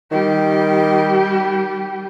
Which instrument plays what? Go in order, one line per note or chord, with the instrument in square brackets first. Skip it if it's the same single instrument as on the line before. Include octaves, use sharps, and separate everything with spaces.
[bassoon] D#3 [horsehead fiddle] G3 G4